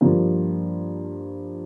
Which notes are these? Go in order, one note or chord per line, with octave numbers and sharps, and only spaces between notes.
G2 F3 A#3